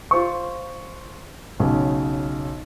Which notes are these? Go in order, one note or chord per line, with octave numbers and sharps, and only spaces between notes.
F4 C5 C#6
B1 C#3